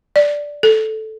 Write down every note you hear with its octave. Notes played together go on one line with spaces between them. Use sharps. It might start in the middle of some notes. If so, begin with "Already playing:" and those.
D5
A4